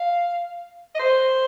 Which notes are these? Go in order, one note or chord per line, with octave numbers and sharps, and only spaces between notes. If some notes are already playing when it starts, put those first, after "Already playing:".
Already playing: F5
D#5
C5